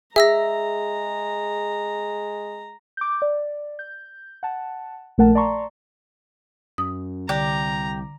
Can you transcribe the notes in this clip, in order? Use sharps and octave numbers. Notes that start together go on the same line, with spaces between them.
G#3 G#4 E5 A#5 E6 A#6
D6 G6
D5
G6
F#5 A5
A#1 A3 A#4 F#5 A5
D5 A5 A#5 C6 C#6
F#2 D#6
C2 D3 G4 A#5